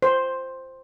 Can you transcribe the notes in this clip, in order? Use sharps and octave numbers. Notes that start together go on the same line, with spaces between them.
C5